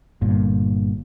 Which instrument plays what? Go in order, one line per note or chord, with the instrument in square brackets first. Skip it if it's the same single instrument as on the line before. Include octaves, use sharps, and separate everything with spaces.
[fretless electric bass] G1 G2 A#2